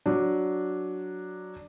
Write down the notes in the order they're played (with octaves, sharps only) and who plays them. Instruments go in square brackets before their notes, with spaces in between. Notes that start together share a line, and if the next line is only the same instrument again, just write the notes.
[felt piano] F#3 D4